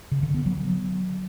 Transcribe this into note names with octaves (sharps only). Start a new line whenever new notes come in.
C#3
D3
B3
F#3